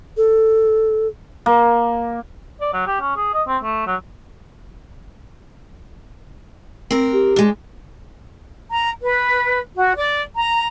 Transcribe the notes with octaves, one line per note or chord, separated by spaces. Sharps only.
A4
A#3
D5
F#3
G4
C#4
G#4
D#5
C4
A3
F#3
C4 A#4
G4
G#3 D4
A#5
B4
F#4
D5
A#5